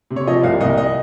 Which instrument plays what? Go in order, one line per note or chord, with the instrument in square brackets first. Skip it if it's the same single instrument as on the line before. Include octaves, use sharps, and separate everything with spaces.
[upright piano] C3
C#5
F3 D#5
C2 F5
C2 D#5
D#5